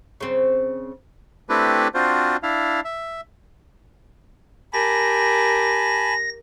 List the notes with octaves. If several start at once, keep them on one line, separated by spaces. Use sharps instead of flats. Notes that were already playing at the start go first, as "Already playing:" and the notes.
C#3 C4
A3 C4 D4 E4 G4 B4
C4 D4 F4 F#4 C5
D4 E4 F5
E5
G4 A#4 G#5 A5 B5 A#6